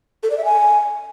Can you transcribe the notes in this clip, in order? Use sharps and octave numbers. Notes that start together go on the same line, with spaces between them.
A4
D5
E5
G#5